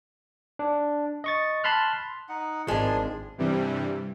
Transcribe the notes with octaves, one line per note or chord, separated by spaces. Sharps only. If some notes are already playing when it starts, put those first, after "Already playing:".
D4
D#5 C#6 A6
A5 B5 C6 F6 F#6
D#4 F#5
G#1 F3 G#3 D4 G#5 A5
G2 C3 E3 G3